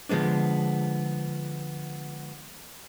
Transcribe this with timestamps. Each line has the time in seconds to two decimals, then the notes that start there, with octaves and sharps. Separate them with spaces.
0.09 D3 F3 G#3 B3 D4